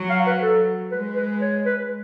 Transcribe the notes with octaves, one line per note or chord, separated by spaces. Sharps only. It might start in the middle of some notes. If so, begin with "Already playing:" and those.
Already playing: F#3
F5
B4
A4
G#3 B4
B4
C#5
B4